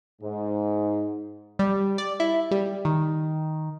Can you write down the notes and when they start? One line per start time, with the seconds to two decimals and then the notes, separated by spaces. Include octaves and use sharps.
0.22 G#2
1.59 G3
1.98 D5
2.20 E4
2.51 G3
2.85 D#3